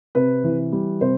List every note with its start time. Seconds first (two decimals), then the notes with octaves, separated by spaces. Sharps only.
0.15 C3 B4
0.44 E3
0.72 G3
1.01 C3 C5